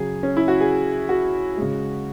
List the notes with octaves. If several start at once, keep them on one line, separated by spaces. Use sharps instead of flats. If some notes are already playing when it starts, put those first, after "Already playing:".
Already playing: C#3 F#3 G#4
C#4
E4
F#4
G#4
F#4
C#3 G#3